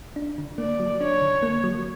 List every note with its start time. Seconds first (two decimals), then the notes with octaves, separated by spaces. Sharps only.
0.16 D4
0.38 D3
0.58 A#3 D5
0.80 F#3
1.01 D4 C#5
1.22 D3
1.42 A#3
1.64 F#3